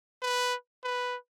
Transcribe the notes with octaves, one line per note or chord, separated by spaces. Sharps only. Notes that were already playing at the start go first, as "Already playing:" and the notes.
B4
B4